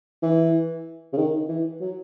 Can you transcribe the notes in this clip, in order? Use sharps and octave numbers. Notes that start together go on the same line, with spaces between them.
E3
C#3
D#3
E3
F#3